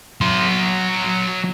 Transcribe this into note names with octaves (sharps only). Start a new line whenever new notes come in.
F#3 C6